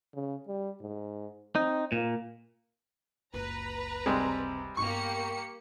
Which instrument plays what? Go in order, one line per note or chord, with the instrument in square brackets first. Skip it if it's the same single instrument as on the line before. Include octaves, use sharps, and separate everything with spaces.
[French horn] C#3
G3
G#2
[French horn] C4 [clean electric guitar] D#4
[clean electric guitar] A#2 [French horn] A#3
[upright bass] F#1 C#2 [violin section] B4 A#5
[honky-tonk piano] C3 [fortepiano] G3 G#3 C4
[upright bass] G2 B3 [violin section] A#3 G4 C#7 [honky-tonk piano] C#6